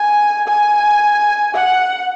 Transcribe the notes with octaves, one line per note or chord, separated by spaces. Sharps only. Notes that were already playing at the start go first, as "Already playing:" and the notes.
Already playing: G#5
G#5
F#5